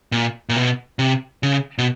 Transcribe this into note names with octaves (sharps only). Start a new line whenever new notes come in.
A#2
A#2
B2
C3
C#3
B2